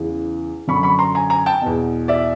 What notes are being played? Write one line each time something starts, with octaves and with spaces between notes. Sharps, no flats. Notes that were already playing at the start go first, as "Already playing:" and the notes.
Already playing: E2 C#3 E3
F#2 D3 B5 C#6
B5 C#6
A#5 C6
G#5 A#5
G#5 A#5
G5 A5
E2 B2
D5 E5